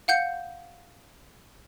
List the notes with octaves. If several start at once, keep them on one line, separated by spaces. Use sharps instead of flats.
F5 F#5 G6 C#7